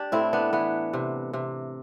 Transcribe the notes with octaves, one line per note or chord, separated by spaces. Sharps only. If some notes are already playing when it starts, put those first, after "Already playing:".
Already playing: D4 G4
A2 C4 E4
B3 D4
E3 B3
C3
C3